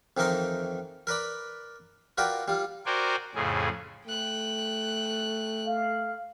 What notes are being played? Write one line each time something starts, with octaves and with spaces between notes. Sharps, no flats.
F2 D#3 E3 D#4 A#4 C6
A#4 B4 D5 B5
F4 F#4 A#4 B4 D5 G5
G3 F4
F#4 A#4 C5 D5 G5 G#5
F2 A2 C#3 G#4
A3 G5 F#6
F5